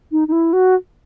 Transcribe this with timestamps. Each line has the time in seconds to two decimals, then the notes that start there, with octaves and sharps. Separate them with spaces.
0.12 D#4
0.28 D#4
0.32 E4
0.53 F#4